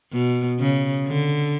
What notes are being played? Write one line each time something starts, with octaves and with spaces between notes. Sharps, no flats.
B2
C#3
D3